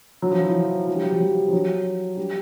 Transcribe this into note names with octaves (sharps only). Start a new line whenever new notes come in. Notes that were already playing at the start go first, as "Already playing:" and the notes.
F#3
F3
E3
F3
F#3
G3
F#3
F3
F#3
F3
F#3
G3